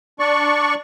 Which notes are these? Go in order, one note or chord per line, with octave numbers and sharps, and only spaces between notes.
D4 D5 C#6